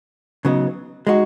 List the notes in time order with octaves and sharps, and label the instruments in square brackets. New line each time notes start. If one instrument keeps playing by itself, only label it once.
[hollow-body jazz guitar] C#3 F#3 B3 D#4
G#3 D#4 F#4